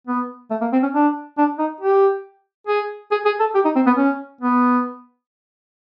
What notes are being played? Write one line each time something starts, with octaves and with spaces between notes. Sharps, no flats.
B3
A3
A#3
C4
C#4
D4
D4
D#4
G4
G#4
G#4
G#4
A4
G4
D#4
C4
B3
C#4
B3